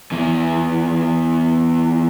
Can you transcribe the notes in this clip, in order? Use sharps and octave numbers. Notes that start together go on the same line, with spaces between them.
E2 E3